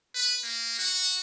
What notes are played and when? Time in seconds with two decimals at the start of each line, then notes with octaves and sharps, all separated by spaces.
0.15 B4
0.44 A#3
0.79 F#4